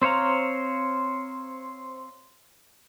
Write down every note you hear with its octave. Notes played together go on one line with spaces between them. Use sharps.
C4 C5 C#5 F5 A#5